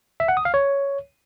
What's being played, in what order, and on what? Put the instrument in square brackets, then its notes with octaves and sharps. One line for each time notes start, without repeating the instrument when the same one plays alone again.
[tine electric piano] E5
F#5
D#6
F5
C#5